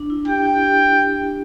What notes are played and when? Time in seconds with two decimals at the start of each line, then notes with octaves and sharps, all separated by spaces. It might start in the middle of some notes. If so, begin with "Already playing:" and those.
Already playing: D4
0.10 E4
0.28 G4 G5
0.46 G4
0.64 G4